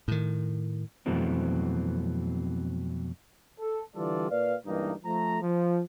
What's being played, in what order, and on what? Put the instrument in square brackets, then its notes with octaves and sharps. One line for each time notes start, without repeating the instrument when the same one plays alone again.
[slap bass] A2 D#3
[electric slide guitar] F2 B2 E3 F#3 A3 C4
[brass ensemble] A4
D3 E3 G3 F4 A4 D5
A#2 B4 D5 F5
C#2 G2 E3 A#3 D#4
F3 A3 A#5
F3